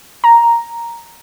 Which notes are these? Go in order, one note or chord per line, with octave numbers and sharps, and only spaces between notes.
A#5